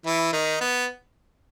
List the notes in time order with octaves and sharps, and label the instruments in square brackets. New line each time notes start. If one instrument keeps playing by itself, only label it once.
[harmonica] E3 E4
D#3 D#4
B3